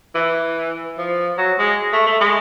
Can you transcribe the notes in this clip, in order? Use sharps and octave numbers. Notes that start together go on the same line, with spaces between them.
E3
F3
F#3
G#3
A3
A3
G#3